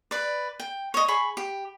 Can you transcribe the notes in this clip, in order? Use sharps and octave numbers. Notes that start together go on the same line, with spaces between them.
B4 D5
G5
C#5 D#5
G#4 B5 C#6
G4